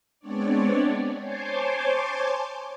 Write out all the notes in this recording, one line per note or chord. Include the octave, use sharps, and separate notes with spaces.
G#3 B3 C4 D4 C#5 D5
C5 C#5 G#5 A5 C6 D6